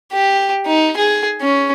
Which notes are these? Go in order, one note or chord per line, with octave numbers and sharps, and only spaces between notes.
G4
D#4
G#4
C#4